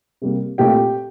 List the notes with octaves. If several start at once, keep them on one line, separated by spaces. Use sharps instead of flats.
C3 G3 A#3
A#2 A3 C4 G4 G5